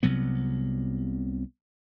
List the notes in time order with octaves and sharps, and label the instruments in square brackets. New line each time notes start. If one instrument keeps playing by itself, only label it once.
[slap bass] C2 C3 F#3 B3